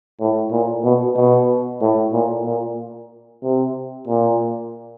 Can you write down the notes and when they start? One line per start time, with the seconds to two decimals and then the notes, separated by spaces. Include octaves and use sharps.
0.20 A2
0.52 A#2
0.84 B2
1.16 B2
1.82 A2
2.13 A#2
2.46 A#2
3.43 C3
4.07 A#2